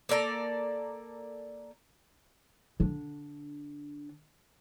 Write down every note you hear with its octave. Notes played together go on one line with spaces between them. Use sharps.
A#3 A4 D5 A#5
D3 D4